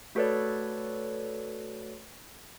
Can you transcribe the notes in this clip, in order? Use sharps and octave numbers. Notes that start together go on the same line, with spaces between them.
A3 F#4 A4 B4 C#5 D5